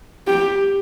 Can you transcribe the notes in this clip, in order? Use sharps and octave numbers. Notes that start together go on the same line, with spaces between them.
G4